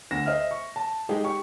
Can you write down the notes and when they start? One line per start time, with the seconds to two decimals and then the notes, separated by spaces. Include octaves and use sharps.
0.11 D2 A#6 E7
0.26 C5 D#5 E5 F6
0.51 C#6
0.76 A5
1.09 G#3 D#4 G4 G#4
1.24 G4 C#6